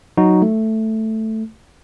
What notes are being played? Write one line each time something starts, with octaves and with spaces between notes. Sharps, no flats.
F#3 D#4 F#4
A3